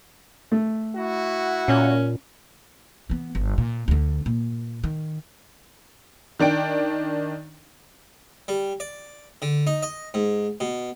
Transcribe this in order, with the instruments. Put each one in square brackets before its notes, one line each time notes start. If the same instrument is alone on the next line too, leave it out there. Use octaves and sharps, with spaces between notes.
[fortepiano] A3
[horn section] E4 F#4
[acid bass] A#2 [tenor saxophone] C#4
[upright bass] E3 B3
G1
A#2
D2 D3
A#2
D#3
[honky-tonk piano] D#3 D4 G5 D7
[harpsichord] G3
D5
D3
D#4
D#5
G#2
B2